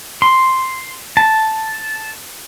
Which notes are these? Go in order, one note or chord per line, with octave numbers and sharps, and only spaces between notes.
C6
A5